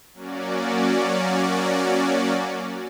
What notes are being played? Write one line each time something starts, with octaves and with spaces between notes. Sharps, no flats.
F#3 A#3 C#4 F#4 D5